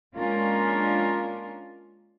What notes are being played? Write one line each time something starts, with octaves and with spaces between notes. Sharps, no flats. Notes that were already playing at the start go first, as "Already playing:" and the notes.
G#3 A#3 C#4 D4 F4 A#4